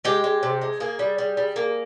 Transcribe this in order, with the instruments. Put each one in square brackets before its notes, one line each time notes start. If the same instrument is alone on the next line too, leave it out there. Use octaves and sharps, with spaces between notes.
[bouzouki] G#3 G4
G#3
C3
G#3
A#3 G#4
G3
G3
G3
A#3